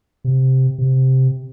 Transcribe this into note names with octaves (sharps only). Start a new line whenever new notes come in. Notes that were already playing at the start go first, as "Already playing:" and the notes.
C3
C3